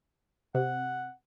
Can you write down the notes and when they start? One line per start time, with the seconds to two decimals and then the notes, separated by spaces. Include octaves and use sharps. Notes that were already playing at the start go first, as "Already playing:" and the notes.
0.55 C3 F#5